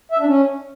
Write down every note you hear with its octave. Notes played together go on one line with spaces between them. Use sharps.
E5
D4
C#4